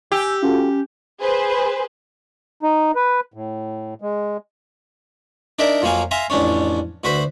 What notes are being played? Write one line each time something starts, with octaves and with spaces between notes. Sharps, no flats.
G4 G#5 E6
C#4 F4 F#4 A4
G#4 B4 C5
D#4
B4
A2
G#3
D4 D#4 A#4 D5 E5
F2 F3 F#3 A#3 F5 G#5
E5 F5 G#5 A#5 C6
A1 F2 C#4 D4 C#5
D2 F#4 B4 C5 B5